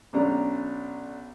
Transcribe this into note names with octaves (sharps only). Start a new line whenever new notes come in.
B1 C#4 D4 A#5